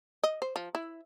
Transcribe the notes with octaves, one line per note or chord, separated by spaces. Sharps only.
D#5
C5
F3
E4